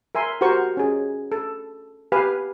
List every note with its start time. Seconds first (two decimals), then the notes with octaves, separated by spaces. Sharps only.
0.15 A#4 E5 G#5 C6
0.41 F#4 G4 A#4 C5 C#6
0.77 C#4 G#4
1.32 A4
2.12 G4 B4 F5 G#5